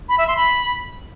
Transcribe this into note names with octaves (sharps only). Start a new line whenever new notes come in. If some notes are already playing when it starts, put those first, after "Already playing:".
B5
E5
C6
B5